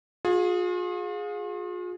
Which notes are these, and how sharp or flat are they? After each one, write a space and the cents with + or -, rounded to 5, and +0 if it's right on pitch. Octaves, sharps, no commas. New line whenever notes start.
F4 +40 G#4 +0